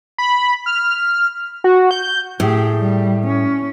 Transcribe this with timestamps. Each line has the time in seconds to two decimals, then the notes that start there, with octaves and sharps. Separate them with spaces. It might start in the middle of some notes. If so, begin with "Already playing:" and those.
0.18 B5
0.66 F6
1.64 F#4
1.91 G6
2.40 A2 G4 G#4
2.76 G3
3.27 C#4